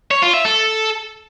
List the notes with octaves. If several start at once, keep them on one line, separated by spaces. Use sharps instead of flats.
C#5
F4
E5
A4